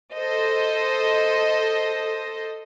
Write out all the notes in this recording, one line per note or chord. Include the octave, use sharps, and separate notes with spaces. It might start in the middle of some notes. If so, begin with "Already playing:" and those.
A4 C5 D#5